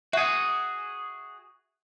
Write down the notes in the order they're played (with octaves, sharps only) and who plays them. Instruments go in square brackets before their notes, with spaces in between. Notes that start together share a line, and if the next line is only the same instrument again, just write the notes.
[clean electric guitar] F#4 G#4 [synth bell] E5